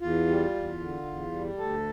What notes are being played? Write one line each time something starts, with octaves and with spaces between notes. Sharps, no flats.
E2 F4
G3
E2
D3
E2
G3
D2 A4